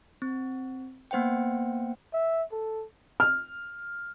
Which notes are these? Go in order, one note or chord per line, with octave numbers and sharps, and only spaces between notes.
C4
A#3 B3 C5 F#5 G5
E5
A4
F6